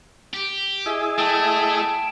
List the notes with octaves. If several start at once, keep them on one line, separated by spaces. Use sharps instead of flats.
G4
E4 G#4 D#5
A3 G5 A5